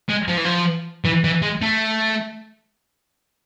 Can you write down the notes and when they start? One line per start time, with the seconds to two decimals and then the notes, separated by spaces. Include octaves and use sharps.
0.09 G#3
0.28 F3
0.37 E3
0.45 F3
1.05 E3
1.24 E3
1.42 G#3
1.62 A3